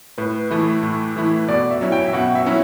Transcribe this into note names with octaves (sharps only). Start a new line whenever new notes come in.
A2 B4
E3 A3 E4
A2
E3 A3 E4
B2 D5
E5
F#3 C#4 E4
G5
E5
B2 F#5
E5
F#3 C#4 E4